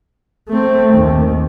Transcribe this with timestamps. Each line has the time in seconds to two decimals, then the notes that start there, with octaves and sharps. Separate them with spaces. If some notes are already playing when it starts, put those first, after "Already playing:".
0.49 A3 C4
0.94 D#2